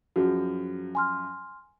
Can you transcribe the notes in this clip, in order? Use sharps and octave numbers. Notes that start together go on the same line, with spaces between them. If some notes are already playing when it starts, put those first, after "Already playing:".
F#2 F3 F#4 G#4
G#5 C6 F6